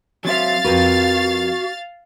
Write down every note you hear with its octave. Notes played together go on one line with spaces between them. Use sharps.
F#3 C4 E5 F5 A6
F2 F#4 A#4 B4